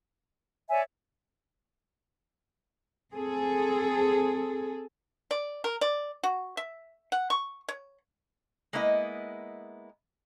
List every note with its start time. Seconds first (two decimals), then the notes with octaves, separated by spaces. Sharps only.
0.69 C#5 D5 E5 G#5
3.14 C4 G#4 A4
5.31 D5
5.64 A#4
5.81 D5
6.23 F#4
6.57 E5
7.12 F#5
7.30 C#6
7.68 C#5
8.73 G#3 A#3 B3 E4 D#5